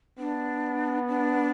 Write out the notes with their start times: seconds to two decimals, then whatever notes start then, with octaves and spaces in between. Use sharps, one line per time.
0.18 B3 D4
1.08 D4